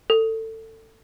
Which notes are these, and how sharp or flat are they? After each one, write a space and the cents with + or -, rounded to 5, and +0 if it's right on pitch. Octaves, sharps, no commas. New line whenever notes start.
A4 +20